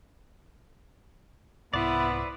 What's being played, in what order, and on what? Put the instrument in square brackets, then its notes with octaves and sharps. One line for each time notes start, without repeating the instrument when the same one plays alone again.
[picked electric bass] C2 G#2 [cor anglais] B3 [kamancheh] E4 [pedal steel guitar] B4 C5 D5